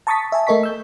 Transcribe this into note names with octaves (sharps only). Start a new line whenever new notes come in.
A5 A#5 C#6 D#6 A6 B6
E5 G#5 A5
A3 A4 A#4 D#5 C#6 B6
E6 G6